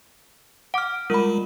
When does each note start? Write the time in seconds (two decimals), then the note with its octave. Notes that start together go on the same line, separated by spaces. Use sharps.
0.74 F#5 D6 F6 D7
1.10 G3 G#3 F4 A#4 B5